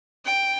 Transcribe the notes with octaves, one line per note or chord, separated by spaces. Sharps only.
G5